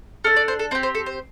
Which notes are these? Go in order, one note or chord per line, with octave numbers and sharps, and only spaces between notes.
D4 A4 F6
D5
C5
A4
C4 G4 C5
C5
A4
C5